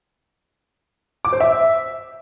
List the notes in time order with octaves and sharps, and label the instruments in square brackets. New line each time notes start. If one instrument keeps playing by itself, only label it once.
[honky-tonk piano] D6
C5
E5